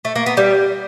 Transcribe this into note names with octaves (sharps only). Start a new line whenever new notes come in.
A3
A#3
B3
G3